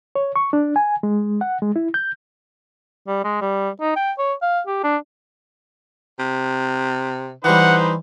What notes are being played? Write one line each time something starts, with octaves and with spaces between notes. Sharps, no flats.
C#5
C#6
D4
G#5
G#3
F#5
G#3
E4
G6
G3
G#3
G3
D#4
G5
C#5
F5
G4
D4
C3
E3 G3 D#4 B4 C5 F#5